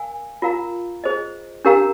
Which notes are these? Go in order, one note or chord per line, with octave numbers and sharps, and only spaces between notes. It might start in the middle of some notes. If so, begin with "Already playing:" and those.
Already playing: A#4 F5 G#5
F4 A#4 F5 A#5
G#4 C5 D#5
D4 G4 A#4 F5 A#5